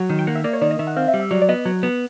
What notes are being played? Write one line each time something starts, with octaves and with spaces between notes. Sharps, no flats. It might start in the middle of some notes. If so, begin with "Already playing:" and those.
Already playing: F#3 F#5
D#3
G5
A#3 F#5
E5
A#3 D5
C#5
D#3 D5
D#5
D#3 E5
F#5
C4 F5
E5
G3
E5
F#3 D5
D5
B3 D#5
F#3
B3